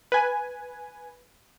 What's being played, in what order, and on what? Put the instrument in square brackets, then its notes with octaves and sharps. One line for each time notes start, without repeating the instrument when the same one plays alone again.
[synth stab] B4 G#5